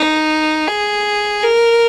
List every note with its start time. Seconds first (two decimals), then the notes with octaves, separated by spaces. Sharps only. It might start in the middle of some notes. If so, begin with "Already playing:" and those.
Already playing: D#4
0.68 G#4
1.43 A#4